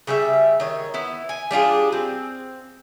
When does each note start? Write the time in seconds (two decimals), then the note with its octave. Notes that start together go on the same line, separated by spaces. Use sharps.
0.07 C#3 G3 A#4 E5
0.60 D#3 C#5
0.94 B3 E4
1.29 G#5
1.51 G3 D4 F4 G#4
1.92 C4